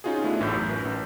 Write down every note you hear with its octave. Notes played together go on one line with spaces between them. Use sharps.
C#4 D#4 F4 F#4 G#4
A3 B3 C#4 D4 E4 F4
A1 A2 A4 G6
F#2
A#4 B4
A1